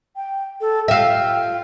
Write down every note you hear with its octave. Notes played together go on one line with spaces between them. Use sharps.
G5
A4
F4 E5 G5